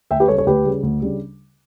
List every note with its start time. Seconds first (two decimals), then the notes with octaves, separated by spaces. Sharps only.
0.10 D2 E5 G5
0.20 G4 B4
0.28 C#3 G3 A4 C#5
0.38 A4 C#5
0.46 D2 G4 B4
0.65 C#3 G3
0.83 D2
1.01 C#3 G3 D4